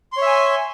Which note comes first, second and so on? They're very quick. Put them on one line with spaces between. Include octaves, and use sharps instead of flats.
C6 C#5 E5 G#5